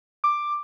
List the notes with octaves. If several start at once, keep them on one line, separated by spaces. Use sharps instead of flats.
D6